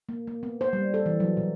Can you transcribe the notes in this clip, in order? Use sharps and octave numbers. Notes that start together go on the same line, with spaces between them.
A#3
A#3
B3
C5
G3
A4
E3
F#3
B2